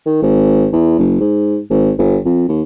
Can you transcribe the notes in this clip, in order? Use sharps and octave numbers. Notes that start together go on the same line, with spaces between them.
D#3
G#1
E2
F#1
G#2
G#1
G1
F2
D#2